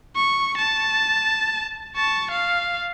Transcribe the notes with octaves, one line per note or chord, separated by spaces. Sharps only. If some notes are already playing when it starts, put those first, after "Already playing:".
C#6
A5
A5 C#6
F5